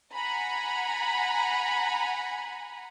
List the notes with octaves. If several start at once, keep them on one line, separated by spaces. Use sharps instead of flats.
F#5 G#5 A#5 B5